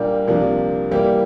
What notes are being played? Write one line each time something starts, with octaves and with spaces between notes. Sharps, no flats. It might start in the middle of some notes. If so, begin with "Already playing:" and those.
Already playing: A#2 G3 A#3 D4 G4
C2 C3 F3 A#3 D4
E3 G3 A#3 E4 G4